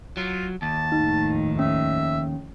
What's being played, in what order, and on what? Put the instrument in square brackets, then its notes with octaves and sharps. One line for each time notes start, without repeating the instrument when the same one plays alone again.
[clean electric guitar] F#3 [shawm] F4
[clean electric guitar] D#2 [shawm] A5
[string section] F2 A2 D#3 [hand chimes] D#4
[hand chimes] C#4 [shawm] E5